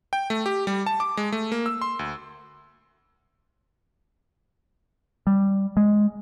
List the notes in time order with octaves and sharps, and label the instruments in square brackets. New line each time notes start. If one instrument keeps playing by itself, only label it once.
[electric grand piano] G5
A3
G4
G3
A5
D6
G#3
A3
A#3
E6
C6
D2
[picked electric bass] G3
G#3